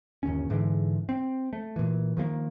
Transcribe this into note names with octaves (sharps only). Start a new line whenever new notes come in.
G1 D#2 C#4
G#2 D3 E3 G#3
C4
A3
A#2 E3
D#3 F3 G#3 A#3